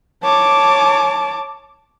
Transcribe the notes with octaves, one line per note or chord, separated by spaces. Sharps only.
C#5 A5 D6